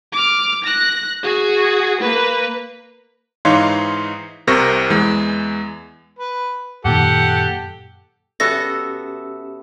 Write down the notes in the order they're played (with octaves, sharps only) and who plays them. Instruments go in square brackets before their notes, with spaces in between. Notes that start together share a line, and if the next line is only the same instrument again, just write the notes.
[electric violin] D6 F6
F#6 A#6
F#4 G#4
A#3 B4
[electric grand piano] G#2 E3 D#4 C#5 F5 C6
C2 C3 A#4 C5 C#6 A#6
E2 E3 G#3
[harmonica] B4
[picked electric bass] F#2 A#2 D#3 [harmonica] G4 A4 [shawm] F#5
[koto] B3 F#4 A4 [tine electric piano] C#4 G4 [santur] E5 [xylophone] A#6